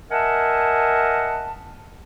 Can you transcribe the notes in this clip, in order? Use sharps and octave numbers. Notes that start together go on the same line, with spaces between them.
A#4 D#5 E5 F#5 G#5 A5